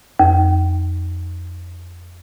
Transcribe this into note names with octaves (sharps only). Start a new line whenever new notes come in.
F2